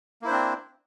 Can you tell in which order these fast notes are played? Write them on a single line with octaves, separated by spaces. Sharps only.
A#3 E4 C5 D4 C4